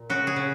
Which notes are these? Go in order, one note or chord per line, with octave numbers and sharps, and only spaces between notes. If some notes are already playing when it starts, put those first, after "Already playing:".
Already playing: A#2
C#3 F#4
G#4
C#3